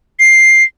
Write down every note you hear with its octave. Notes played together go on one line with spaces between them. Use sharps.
C7